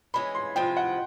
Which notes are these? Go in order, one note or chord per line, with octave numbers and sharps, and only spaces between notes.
E3 G#3 C#4 B5
C6
C3 F3 G#3 G5
F#5